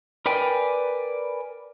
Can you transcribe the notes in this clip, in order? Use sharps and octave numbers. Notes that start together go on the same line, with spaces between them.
A#4 B4 D5 G5 G#5